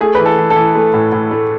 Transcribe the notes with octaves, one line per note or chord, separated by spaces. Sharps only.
A3 G#4
E3 B4
A4
E3
A4
E3
A3
A2
A2
A3